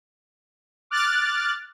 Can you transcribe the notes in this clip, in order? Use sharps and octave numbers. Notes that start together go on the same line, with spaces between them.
D6 F6 F#6 A6